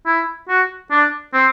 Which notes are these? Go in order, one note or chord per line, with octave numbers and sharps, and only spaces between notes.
E4
F#4
D4
C4